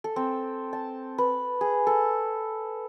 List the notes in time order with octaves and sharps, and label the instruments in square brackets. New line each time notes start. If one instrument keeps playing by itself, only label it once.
[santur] A4
C4
A5
B4
G#4
A4